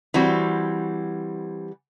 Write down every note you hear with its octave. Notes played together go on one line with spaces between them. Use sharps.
E3 G3 C4 F#4